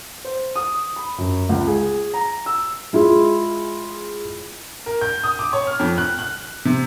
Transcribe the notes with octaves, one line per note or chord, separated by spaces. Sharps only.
C5
D#6
B5
F#2
C#2
G#4
A#5
E6
G#3 E4 F4 G#4
A#4
G6
D#6
D6
C#5
F6
F2
F#6
F#6
C3